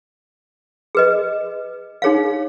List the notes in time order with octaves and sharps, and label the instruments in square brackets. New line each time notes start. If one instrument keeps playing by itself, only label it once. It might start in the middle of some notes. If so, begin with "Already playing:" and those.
[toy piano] G#4 B4 D#5
D#4 G#4 C#5 F5